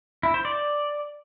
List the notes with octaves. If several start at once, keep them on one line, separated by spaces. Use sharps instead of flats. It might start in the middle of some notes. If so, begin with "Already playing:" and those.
E4
C5
D5